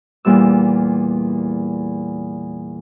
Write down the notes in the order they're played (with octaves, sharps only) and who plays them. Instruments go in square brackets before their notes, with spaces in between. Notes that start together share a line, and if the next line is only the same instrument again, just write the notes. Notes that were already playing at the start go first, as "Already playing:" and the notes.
[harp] E2 A#2 G3 E6